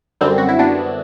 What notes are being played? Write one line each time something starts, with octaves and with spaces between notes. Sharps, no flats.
F#2 D3 G3 C4
F#4
E4
B3 D4